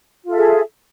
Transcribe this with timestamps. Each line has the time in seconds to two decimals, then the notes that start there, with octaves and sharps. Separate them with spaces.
0.25 F4
0.28 A4
0.32 E5
0.36 G#4